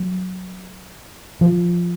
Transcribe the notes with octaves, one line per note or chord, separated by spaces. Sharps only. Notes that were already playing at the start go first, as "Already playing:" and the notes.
Already playing: F#3
F3